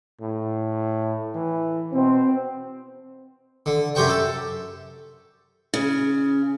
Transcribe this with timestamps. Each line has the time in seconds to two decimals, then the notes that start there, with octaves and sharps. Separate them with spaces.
0.21 A2
1.35 E3
1.93 B2 C4
3.66 D3
3.95 F#2 C3 G4 C5 G5 C#6
4.09 A4
5.74 C#3